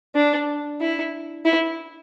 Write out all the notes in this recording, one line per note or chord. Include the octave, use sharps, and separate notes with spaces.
D4
E4
E4